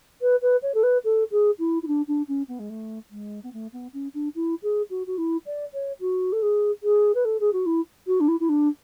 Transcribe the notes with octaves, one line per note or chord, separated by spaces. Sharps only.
B4
B4
C#5
A4
B4
A4
G#4
E4
E4
D4
D4
C#4
B3
G#3
A3
G#3
B3
A3
B3
C#4
D4
E4
G#4
F#4
F#4
E4
D5
C#5
F#4
A4
G#4
G#4
B4
A4
G#4
F#4
E4
F#4
D4
E4
E4
D4